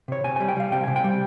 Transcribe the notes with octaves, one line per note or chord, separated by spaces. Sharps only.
C3 C#5
C3 G#5
G3 G#5
G5
G3 F5
C3 G5
C3 G#5
G5
G3